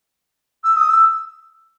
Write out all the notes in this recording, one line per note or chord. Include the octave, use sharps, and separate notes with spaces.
E6
D#6
E6